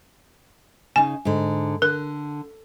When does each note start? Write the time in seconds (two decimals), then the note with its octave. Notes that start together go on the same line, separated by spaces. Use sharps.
0.96 C#3 D#4 G#5
1.25 G#2 D3
1.82 D3 A#4